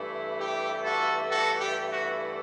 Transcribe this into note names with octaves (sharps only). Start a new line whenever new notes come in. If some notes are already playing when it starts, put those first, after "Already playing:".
Already playing: G2 E3 A3 E4
G4
F#4 A4
F#4 A4
G4
F#4